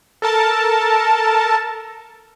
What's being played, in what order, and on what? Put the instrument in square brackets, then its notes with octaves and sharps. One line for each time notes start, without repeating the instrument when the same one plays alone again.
[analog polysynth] A4 A#4 A5